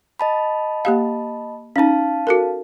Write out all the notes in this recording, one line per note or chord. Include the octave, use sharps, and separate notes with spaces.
D#5 A5 B5
A#3 G4 F5
C#4 D#4 F5 A5
F#4 A4 A#4